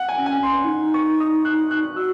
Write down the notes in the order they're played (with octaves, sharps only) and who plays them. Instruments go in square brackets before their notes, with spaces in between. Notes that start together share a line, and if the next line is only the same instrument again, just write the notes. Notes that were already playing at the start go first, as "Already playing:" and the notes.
Already playing: [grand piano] F#5
G#5
[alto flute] C#4
[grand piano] G#5
[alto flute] C#4 [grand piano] C6
[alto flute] E4
D#4
[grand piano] C#6
D#6
F#6
F#6
[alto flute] F#4 [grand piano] E6